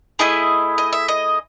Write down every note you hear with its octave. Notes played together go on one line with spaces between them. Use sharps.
A3 E4 G#4 D#5
D#5
E5
D#5